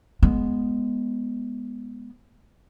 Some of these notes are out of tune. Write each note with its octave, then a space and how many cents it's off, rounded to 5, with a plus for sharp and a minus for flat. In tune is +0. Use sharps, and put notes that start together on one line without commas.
G#3 +0 B3 -5